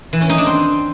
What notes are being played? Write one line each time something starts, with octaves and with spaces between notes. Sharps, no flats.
E3
C#4
D#4
D4
C4